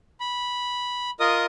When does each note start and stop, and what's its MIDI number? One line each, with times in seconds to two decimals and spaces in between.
0.20 1.11 83
1.20 1.46 65
1.20 1.46 70
1.20 1.46 75
1.20 1.46 87